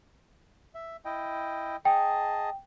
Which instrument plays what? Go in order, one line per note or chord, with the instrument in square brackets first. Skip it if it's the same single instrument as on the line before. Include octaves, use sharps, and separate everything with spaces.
[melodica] E5
E4 D#5 G5
[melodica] G#4 D#5 A5 [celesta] G5